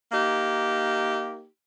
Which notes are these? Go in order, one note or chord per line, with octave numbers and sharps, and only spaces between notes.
A#3 D#4 G4